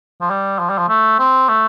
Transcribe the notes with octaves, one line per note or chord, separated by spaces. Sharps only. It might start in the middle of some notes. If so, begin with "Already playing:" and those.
F3
G3
F3
G3
F3
A3
C4
A3